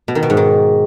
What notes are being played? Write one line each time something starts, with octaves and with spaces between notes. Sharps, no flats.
B2
D#3
B2
G#2
D#3